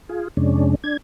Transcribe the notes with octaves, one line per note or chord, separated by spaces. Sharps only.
F4 G#4
F2 C3 G#3 C#4 D4
D4 G#6